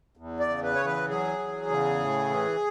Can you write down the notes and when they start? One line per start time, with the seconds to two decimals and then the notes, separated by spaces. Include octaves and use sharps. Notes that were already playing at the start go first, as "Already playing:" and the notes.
0.17 E2
0.40 D5
0.48 C#3
0.63 B4
0.75 E2 C#5
0.85 B4
1.08 F#3 G#4
1.39 E2
1.69 C#3
1.99 A2
2.30 E3